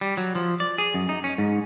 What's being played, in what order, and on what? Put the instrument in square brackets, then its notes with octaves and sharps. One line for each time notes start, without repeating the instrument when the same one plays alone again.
[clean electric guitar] G3
F#3
F3
D5
G#4
F#2
D#4
C#4
G#2